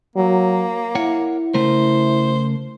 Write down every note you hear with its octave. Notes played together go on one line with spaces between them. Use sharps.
F#3 A#3
E4 A#4 C#5 F#5
C#3 A3 A#4 C5